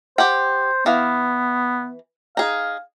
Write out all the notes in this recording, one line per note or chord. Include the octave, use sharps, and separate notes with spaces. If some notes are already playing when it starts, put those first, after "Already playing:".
G4 C5 F#5 G5
E3 B3 F5
D#4 G#4 F5